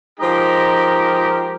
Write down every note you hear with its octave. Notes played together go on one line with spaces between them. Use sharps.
F3 G#3 D#4 G4 A#4